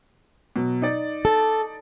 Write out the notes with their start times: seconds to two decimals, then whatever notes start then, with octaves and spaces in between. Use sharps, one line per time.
0.56 B2 F#3
0.82 D#4 D5
1.25 A4